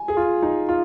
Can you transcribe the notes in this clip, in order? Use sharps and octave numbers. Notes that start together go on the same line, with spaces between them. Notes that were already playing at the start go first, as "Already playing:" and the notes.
Already playing: G#5
G#4
F4
D#4
F4